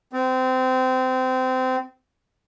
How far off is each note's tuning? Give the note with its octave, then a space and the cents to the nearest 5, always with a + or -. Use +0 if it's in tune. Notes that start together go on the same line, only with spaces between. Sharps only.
C4 -25